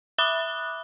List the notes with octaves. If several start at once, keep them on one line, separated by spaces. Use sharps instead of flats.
E5 B5 D6 D#6 F#6